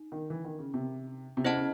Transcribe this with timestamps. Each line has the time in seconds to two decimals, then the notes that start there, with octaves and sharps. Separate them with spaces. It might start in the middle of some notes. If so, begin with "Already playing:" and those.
Already playing: D#4
0.12 D#3
0.30 E3
0.44 D#3
0.59 C#3
0.74 C3
1.37 C3
1.44 C#3 E4 C5 D#5 F#5 A5
1.57 C#3